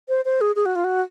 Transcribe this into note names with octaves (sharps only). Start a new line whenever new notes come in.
C5
C5
G#4
G#4
F#4
F4
F#4